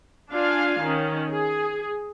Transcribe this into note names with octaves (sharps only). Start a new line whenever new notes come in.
D4 F4 F5 G#5
D#3 C#4
G#4